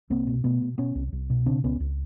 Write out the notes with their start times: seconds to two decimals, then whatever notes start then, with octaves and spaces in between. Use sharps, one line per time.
0.10 C2 A#3 C4
0.27 B2
0.44 B2 A3 B3
0.62 B2
0.78 B2 B3 C#4
0.95 C2
1.13 C2
1.30 B2
1.46 C#3 C4 D4
1.64 C#2 B3 C#4
1.80 C#2